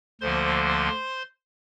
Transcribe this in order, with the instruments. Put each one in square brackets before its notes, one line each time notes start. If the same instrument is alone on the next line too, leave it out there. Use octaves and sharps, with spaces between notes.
[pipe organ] D2 D3 F3 A#3 C5 C6